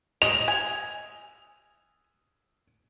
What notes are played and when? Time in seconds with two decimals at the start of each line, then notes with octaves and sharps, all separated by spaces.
0.22 D#5 F7
0.48 G#5